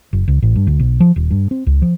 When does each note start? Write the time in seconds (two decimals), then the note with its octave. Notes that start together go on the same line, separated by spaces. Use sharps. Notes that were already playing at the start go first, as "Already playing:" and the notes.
0.13 F#1
0.28 C#2
0.42 A1
0.56 G2
0.67 D2
0.80 B1
1.00 F3
1.16 D#1
1.31 G2
1.51 C4
1.67 C#2
1.82 F3